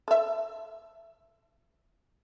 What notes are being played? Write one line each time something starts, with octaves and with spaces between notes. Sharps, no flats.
A4 E5